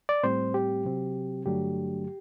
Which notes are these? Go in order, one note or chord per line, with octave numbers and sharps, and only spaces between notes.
D5
A2 G3 C4 C5
G4
C3 F#3 C4
G2 D3 F#3 A3 D4 G4